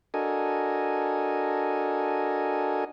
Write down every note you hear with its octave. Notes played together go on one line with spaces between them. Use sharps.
D4 F#4 A4 A#4 D#5 G#5